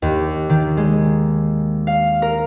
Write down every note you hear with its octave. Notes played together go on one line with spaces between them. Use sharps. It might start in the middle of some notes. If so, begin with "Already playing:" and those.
D#2
D#3
G#3
F5
A#4